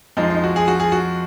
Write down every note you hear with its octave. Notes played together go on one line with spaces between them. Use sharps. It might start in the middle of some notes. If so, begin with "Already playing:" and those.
F2 F3 G#3 D#4
D#4
F#4
G#4
F#4
G#4
F#4